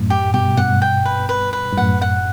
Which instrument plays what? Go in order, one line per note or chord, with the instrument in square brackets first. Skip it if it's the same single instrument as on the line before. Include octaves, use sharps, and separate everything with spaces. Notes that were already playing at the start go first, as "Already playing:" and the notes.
Already playing: [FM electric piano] F#2 A2
[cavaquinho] G4
[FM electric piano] G2 B2 [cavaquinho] G4
[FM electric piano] G2 B2 [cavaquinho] F#5
[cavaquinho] G5
B4
B4
B4
[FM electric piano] G2
[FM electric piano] F#2 A2 [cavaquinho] F#5
[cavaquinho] F#5